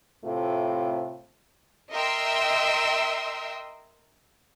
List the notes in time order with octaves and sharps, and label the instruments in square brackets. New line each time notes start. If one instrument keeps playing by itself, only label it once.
[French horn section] A2 C3 A3 F4
[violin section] A#4 D#5 E5 G5 C6 E6